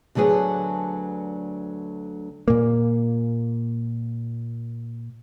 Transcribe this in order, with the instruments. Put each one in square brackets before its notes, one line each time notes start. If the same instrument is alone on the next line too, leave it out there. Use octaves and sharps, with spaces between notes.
[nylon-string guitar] D2 D3 F#3 B3 G#4
[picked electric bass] A#2 A#3